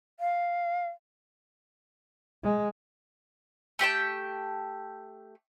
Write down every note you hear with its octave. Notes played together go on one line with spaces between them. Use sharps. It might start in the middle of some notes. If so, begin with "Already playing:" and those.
F5
G#3
A3 G4 G5 A5